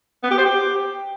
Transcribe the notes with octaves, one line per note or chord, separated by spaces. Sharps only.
B3
G4
C5
G4